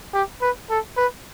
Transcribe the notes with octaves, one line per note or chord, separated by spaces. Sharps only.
G4
B4
A4
B4